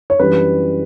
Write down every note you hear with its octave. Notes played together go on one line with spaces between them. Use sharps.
C#5
F#2 E3 G3 D4 B4